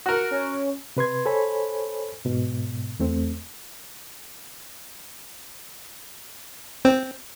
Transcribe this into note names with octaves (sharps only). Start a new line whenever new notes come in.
F#4 A#4 F#5
C#4
C3 B4 C6 G#6
A4 C5 C#5 G#5 B5
G#2 B2
E2 A3 C4
C4